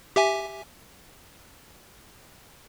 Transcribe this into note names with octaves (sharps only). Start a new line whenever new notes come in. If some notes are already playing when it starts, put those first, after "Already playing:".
G4 E5 G#5